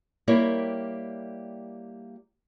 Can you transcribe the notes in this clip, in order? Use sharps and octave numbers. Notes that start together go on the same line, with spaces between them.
G3 A#3 E4 G4 A#4 C#5